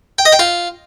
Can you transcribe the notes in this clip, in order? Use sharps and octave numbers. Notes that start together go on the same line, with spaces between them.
G5
D#5
G5
F4